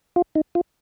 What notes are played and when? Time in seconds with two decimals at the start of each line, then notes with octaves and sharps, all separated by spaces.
0.16 F4
0.35 D#4
0.55 F4